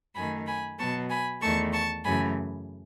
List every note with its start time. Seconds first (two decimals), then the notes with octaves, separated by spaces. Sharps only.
0.15 F#2 D#3 A3 G#5 B5
0.46 G#5 B5
0.78 B2 F#3 B3 A5 C#6
1.09 G#5 B5
1.41 E2 D#3 A3 A5 C#6
1.72 A5 C#6
2.04 F#2 C#3 E3 A3 G#5 B5